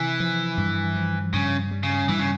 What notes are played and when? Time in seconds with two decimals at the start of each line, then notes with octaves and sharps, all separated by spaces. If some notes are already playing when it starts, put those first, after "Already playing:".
Already playing: C3 E3
0.20 F3
0.58 G2
0.95 F3
1.33 G2 C#3
1.71 G3
1.83 C#3
2.08 G2 E3
2.19 C#3